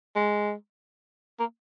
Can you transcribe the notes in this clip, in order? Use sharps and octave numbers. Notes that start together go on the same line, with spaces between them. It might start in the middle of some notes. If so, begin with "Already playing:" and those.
G#3
A#3